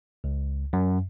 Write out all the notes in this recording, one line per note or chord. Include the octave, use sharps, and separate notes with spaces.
C#2
F#2